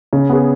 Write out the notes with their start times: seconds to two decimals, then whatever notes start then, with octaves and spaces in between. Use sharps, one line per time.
0.13 C#3
0.30 B3 G#4